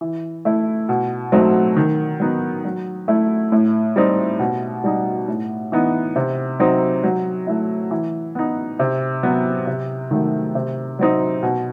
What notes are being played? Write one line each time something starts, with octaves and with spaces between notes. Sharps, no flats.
E3
A3 E4
B2
F#3 A3 C4 D#4
D#3
F#3 B3 D#4
F#3
A3 E4
A2
G3 C4 D#4
B2
G3 D#4
A2
E3 B3 D#4
C3
F#3 C4 D#4
F#3
A3 E4
E3
B3 D#4
C3
F#3 B3
C3
D#3 F#3 A3
C3
F#3 C4 D#4
B2